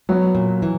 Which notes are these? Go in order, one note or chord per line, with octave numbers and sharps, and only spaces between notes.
F#3 B3
A#2
E3